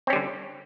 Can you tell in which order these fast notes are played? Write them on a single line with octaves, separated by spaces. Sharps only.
C4 C#4 G3 D3